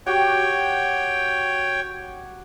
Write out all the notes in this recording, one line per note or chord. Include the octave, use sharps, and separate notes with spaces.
F#4 G4 C#5 G5